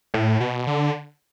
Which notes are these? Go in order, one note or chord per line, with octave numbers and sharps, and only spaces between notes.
A2
B2
D3